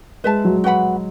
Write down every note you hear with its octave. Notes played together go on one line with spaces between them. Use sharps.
G#3 B4 E5 A5
F#3
F#4 B4 F#5 B5